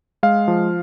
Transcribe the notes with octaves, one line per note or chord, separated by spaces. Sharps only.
G#3 F5
F3